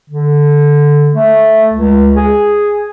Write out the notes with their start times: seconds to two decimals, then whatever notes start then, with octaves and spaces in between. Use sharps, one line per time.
0.10 D3
1.13 A3
1.73 C#2
2.16 G#4